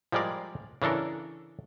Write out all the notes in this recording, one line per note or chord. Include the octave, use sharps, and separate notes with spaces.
F3 G3 G#3 A#4 D5 F5
C#3 E3 D4 A4 A#4